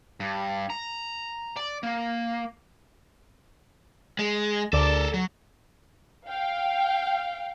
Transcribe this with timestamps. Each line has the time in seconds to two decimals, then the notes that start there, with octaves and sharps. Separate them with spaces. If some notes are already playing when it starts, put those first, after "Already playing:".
0.20 G2
0.70 A#5
1.56 D5
1.83 A#3
4.19 G#3
4.73 D2 A4 A#4 D5
5.14 F#3
6.27 F5 G5